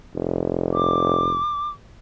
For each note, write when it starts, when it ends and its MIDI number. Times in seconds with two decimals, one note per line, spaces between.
0.15 1.46 29
0.73 1.70 86